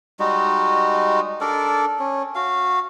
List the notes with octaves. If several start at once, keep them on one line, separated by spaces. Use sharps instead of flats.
G3 G#3 D#4 F#4
D4 A4 A#4 D5
C#4
F#4 F5